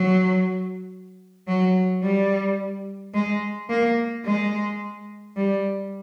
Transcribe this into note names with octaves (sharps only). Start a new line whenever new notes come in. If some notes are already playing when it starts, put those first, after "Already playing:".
Already playing: F#3
F#3
G3
G#3
A#3
G#3
G3